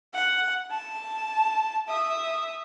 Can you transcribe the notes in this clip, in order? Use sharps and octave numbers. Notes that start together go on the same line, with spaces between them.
F#5
A5
E5 D#6